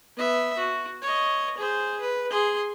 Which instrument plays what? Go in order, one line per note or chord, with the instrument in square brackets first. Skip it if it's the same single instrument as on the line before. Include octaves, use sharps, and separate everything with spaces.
[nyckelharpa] B3 E5
F#4
C#5 D#5
G#4 C5
B4
G#4 C6